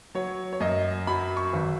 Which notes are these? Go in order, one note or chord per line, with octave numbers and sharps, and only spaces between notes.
F#3 C#5
C#5
F#2 D#5
F#3 B5
C#6
G#1